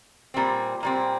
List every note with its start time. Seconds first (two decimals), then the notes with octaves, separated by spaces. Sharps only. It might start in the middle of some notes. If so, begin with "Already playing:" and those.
0.34 A#2 G3 C4
0.83 A#2 G3 C4